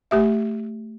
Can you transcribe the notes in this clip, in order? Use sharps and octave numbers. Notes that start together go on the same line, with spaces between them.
A3 G4 E5